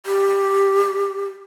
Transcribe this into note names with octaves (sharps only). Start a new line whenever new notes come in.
G4